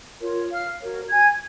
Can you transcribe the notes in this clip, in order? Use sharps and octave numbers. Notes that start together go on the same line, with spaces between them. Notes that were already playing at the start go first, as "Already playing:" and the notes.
F4 A#4 C#5
F5 F6
F#4 A#4 C#5
G#5 G#6